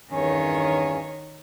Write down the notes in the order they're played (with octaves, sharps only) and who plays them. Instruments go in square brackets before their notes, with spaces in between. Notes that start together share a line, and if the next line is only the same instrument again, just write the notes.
[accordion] E2 G2 C#4 [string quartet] D#3 C#5